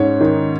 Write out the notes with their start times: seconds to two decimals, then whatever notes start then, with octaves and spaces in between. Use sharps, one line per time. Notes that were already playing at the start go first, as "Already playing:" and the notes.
Already playing: G#2 C#4 C#5
0.21 D#3